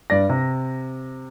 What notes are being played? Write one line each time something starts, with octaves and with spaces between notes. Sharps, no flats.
G2 D5 A#6
C3